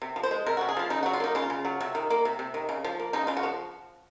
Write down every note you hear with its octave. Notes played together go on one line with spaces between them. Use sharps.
C3
F3
C5
G#3
C3 A#4
F#4
C3
G#4
F3 F4
C#3 D#4
F#4
F#3
F4
A#3 D#4
C#3 F4
C#3
F#3
C3
D#3
A#3
C3
C3
D#3
C#3
F3
A#3
C#3 D#4
C#3 F4
F#4
F3